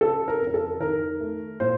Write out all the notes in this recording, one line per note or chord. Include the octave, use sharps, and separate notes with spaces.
C#3 A4
A#4
F2
A#4
A4
D#3 A#4
A3
A#2 C5